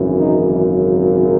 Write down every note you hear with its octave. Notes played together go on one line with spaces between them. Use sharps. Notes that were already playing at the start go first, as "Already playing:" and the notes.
Already playing: G#1 F#2 C#3 E3
D#4